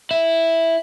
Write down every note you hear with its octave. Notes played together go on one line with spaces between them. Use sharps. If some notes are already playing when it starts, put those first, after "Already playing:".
E4